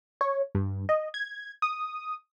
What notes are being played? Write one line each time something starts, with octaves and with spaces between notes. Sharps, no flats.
C#5
G2
D#5
G#6
D#6